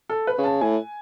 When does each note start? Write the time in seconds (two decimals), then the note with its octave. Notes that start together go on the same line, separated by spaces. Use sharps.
0.10 A4
0.27 B4
0.38 C#3
0.44 A5
0.61 A2 G#5